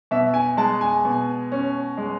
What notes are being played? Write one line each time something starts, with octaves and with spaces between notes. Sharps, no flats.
B2 E5
G#5
G#3 A5
G#5
B2
C#4
G#3